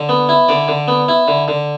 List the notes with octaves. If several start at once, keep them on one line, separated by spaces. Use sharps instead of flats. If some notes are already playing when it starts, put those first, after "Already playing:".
Already playing: D3
B3
E4
D3 D5
D3
B3
E4
D3
D3